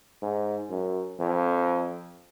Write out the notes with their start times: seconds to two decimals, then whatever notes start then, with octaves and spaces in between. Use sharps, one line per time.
0.22 G#2
0.70 F#2
1.19 F2